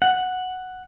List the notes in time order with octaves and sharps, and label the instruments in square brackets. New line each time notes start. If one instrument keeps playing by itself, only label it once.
[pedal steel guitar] F#5